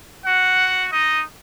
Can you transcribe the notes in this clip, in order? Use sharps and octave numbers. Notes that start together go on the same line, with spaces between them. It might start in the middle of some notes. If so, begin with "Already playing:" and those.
F#4 F#5
D#4 D#5